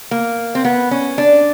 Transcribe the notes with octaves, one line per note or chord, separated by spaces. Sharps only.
A#3
C4
B3
C#4
D4